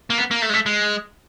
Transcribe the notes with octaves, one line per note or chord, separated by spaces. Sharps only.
A#3
B3
A#3
A3
G#3
A3
G#3